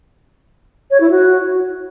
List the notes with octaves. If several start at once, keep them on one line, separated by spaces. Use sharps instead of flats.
C#5
E4
F#4